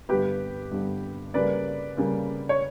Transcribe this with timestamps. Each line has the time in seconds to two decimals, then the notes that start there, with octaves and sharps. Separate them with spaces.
0.09 G2 D3 G3 B3 G4 B4
0.71 G2 D3 G3 B3
1.34 C#3 G3 A#3 B4 D5
1.97 C#3 G3 A#3
2.49 C#5